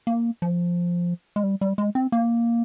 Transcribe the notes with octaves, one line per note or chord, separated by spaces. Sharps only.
A#3
F3
G#3
G3
G3
G#3
C4
A#3